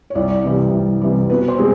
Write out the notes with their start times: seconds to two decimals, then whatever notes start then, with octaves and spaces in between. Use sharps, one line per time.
0.10 C#5
0.15 C2 D5
0.44 C3 E3 G3
0.73 C2
1.01 C3 E3 G3
1.30 B2 B4
1.48 C5
1.58 G#3 C4